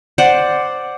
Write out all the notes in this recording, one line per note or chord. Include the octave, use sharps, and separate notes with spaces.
C5 D5 F#5